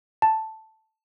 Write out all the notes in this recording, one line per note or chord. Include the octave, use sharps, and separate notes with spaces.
A5